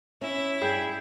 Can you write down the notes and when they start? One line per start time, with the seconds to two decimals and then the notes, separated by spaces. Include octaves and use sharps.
0.21 C#4 E4 E5
0.62 G2 G#4 G5 B5